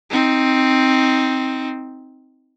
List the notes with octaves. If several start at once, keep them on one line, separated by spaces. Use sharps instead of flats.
C4 D#4